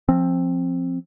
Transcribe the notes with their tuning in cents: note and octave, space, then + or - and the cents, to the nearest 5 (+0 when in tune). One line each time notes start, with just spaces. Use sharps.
F3 +0 C4 +10